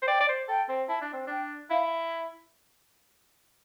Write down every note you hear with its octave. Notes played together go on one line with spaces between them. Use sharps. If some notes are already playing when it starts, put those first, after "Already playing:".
C5
D5 G5
D5
C5
A4 G5
C4
E4 A5
D4
C4
D4 G5
E4 F5